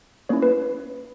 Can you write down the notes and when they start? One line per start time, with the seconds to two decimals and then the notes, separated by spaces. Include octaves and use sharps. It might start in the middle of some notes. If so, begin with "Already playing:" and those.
0.29 A#3 C#4 E4 C#5
0.43 B4